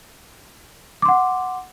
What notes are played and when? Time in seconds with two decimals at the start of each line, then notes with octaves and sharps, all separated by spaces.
1.02 D6
1.05 C6
1.08 F#5